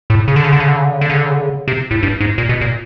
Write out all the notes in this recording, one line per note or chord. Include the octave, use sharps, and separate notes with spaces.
A2
C#3
D3
C#3
D3
C#3
D3
C#3
D3
C#3
D3
C#3
D3
C#3
D3
C#3
C3
A2
G2
G#2
A#2
B2
A#2